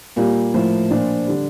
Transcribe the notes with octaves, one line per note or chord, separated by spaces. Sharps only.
A#2 G3 A#3
A2 F3
A#2 F3 D4
D3 G3